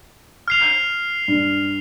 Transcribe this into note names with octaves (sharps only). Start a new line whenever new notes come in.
F6 C7 F7
G2